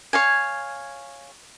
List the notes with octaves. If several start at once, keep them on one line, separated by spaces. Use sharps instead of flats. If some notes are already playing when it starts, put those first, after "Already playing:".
C#5 F5 G#5